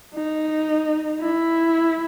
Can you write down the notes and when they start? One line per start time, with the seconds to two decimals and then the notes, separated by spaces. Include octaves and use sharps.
0.15 D#4
1.20 E4